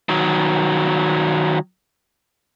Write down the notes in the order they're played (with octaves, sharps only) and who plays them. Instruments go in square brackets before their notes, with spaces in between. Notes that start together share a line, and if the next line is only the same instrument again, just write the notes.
[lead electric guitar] D#3 F#3